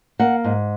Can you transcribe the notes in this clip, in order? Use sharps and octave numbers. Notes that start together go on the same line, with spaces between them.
A#3 F#5
G#2